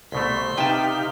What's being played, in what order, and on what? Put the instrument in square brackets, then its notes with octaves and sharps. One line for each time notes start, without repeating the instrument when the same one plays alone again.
[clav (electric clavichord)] C2 B2 A3 [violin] C6 B6
[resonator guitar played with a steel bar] C3 G5 [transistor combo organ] D#4 G4 F5 [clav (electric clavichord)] B4 A5